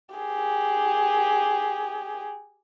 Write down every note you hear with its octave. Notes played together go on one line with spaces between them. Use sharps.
G4 G#4